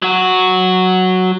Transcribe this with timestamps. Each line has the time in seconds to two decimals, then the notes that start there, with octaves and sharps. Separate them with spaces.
0.02 F#3 F#4